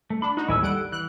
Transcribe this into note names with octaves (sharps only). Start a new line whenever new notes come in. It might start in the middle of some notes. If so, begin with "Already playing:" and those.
A3
D4 B5
D#4 F#4
A1 D#2 E4 G#5 E6
G3 A4 F#5 D7
E3 F#6